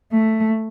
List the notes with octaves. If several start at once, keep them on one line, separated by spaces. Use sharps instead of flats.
A3